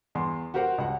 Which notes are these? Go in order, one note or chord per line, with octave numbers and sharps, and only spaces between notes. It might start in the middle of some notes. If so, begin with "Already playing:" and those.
E2 C6
F#4 G4 A#4 C5 F#5
C#2 F#5